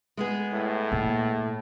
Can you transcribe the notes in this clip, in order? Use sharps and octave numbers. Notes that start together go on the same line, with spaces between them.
G#3 B3 G#4
A2
A#2